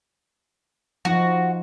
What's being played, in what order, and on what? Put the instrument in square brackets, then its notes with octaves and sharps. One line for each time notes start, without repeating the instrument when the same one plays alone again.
[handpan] F3 D#4 [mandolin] F#4